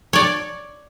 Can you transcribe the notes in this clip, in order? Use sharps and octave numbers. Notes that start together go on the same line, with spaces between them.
C#5 D5